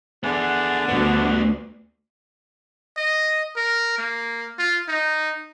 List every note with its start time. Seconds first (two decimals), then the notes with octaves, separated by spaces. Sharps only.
0.23 D3 B3 D4 G#4
0.89 D2 G3 B3
2.97 D#5
3.56 A#4
3.98 A#3
4.59 F4
4.89 D#4